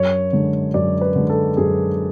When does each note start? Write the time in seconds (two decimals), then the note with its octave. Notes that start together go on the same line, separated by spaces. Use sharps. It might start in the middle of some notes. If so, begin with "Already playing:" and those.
Already playing: F#2 C#5
0.33 D3 G#3
0.74 F#2 D5
1.01 B4
1.16 D3 G#3
1.30 A4
1.57 F#2 G#4